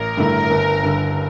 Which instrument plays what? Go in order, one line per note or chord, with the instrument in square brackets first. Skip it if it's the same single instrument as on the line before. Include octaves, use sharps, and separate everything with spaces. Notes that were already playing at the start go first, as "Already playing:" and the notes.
Already playing: [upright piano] A1 [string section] A#4
[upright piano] G2 D3 A3 E4
G1
G2 D3